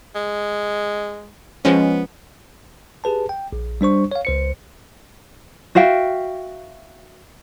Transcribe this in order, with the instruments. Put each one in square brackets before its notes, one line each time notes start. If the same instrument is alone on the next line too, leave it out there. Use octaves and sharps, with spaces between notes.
[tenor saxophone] G#3
[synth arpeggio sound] F3 G#3 C#4 [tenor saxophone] B3
[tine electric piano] G4 G#4 B4 A5
G5
A#1
G3 D4 C5 C#6
C#5 F5
C#2 C5 C#7
[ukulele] F#4 E5 F5 G5